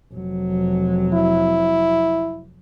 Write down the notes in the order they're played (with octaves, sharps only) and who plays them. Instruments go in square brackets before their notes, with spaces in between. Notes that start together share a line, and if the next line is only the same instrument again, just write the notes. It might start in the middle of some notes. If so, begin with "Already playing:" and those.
[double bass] F1 F#3
[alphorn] E4